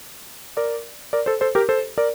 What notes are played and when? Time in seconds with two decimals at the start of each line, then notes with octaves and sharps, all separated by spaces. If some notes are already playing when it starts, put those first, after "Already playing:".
0.57 A#4 D5
1.13 A#4 D5
1.26 A4 C5
1.41 A4 C5
1.55 G4 A#4
1.69 A4 C5
1.98 A#4 D5